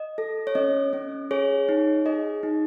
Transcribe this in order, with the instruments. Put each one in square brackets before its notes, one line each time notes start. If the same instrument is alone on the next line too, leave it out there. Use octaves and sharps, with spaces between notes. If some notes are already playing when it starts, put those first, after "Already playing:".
Already playing: [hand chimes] D#5
A4
C#5
C#4 D#5
C#4
G#4 C#5
D#4
G#4 D#5
D#4